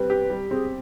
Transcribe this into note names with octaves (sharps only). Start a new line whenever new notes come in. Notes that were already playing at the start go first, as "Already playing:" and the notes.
Already playing: G3 C4 B4
G4
G3
C4 G#4